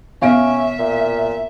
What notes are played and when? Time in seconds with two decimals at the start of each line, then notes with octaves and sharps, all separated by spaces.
0.22 B2 C#4 E5 F5 D7
0.79 A#2